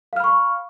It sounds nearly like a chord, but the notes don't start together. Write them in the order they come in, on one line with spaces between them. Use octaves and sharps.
F5 F6 B5 C#6